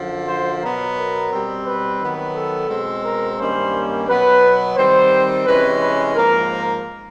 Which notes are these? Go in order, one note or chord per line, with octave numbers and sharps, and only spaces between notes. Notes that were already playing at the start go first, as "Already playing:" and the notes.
Already playing: F#2 D3 F3
C5
B2 F#3 B3 A#4
A#4
B2 G3 C4
B4
D#3 F#3 B3
A4
B2 G#3 C4
A#4
G2 D#3 G3 A#3 C#4 C5
B2 F#3 B3 B4
D#3 G3 C4 C5
C3 E3 G#3 C#4 B4
B4
G#2 F3 A#3 A#4